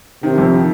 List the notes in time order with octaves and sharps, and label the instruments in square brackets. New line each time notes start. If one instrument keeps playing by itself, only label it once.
[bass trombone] C3 [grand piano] D#3
[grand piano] F2
D#3